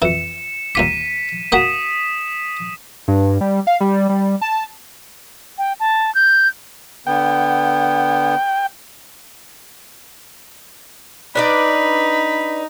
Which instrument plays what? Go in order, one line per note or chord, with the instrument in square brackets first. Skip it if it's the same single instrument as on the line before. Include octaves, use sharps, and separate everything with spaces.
[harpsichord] F2 E3 [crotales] C#7 E7
[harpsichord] D#2 F4 D6 [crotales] B6 D#7 E7
[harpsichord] A#3 F#4 F#5 [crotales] D#6 B6 E7
[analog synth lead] G2
G3
F5
G3
G3
A5
[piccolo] G5
A5
G6
[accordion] D3 B3 [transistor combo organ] G5
[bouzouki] D4 B4 D5 [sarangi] D#4 [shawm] B5